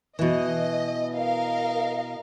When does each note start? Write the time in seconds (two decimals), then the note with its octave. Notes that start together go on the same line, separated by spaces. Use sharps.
0.19 B2 E3 D#5
1.15 A#4 D#5 F5